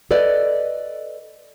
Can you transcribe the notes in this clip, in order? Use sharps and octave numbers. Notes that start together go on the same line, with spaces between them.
A4 B4 D5 D#5